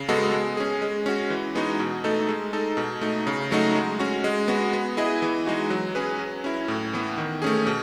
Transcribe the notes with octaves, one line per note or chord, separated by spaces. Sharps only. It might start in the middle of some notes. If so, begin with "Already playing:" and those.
Already playing: C#3
G#3 B3 F#4 A4
G#3
C#4 G#4
G#3
C#4 F#4
E3
G#3 B3 D#4 F#4
B2
A3 D#4 A4
G#3
D#4 A4
B2
A3 D#4
C#3
F#3 A3 D#4 F#4
G#3
C#4 F#4
G#3
B3 F#4
B3
E4 G#4 D#5
E3
G#3 D#4 F#4
F#3
C#4 G#4 B4
F#3
C#4 E4
A2
E3 B3
D#3
A3 C#4 G#4
B2